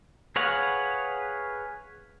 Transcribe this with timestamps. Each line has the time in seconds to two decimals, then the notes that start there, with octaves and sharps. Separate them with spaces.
0.36 G#4 B4 C#5 F5 F#5